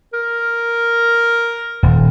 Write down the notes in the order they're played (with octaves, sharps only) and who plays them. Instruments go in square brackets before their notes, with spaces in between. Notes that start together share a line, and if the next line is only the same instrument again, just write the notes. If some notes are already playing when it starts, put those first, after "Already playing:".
[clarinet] A#4
[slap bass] D#1